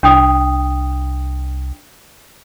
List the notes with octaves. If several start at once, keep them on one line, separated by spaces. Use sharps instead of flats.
C2 D4 G5 D#6